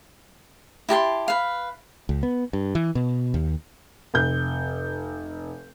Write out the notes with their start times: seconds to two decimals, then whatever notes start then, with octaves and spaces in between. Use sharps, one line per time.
0.89 E4 G4 A5 C6
1.28 B4 F5
2.09 C#2
2.23 B3
2.53 G2
2.75 E3
2.95 B2
3.34 D#2
4.14 F1 G6